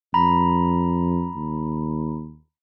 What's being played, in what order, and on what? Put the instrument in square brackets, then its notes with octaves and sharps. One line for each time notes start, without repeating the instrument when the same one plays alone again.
[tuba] F2 [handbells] A#5 B5
[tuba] D#2